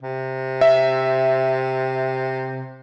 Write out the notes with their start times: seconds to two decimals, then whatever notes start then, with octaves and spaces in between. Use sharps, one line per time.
0.02 C3
0.61 E5